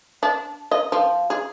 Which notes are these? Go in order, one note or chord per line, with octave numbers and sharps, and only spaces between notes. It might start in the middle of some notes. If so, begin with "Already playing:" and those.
D4
D#5
F3
G#4